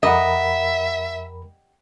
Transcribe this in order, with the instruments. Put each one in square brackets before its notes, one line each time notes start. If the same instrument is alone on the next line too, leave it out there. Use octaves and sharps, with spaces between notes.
[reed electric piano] F2 A#4 B5 [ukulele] G4 F#5 [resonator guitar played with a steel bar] D#5 [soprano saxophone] E5